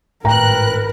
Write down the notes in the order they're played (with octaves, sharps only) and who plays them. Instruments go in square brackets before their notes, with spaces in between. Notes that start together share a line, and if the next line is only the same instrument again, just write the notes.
[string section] G#1 F#6 [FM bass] A2 [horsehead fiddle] A#4 B4 [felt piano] G5 A#5